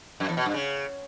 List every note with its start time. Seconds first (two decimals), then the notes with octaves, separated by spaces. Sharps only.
0.20 F#2
0.29 E2
0.37 B2
0.46 G2
0.54 C#3